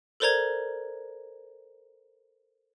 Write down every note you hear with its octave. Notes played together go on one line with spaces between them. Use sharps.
A4 A#4 C5 D5 A#5 G#6